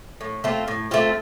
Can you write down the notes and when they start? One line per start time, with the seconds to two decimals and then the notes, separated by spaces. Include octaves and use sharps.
0.21 A2
0.44 A3 C4 F4
0.68 A2
0.91 A3 C4 F4